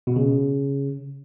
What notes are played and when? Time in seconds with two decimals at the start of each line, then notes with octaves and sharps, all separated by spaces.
0.07 B2
0.16 C#3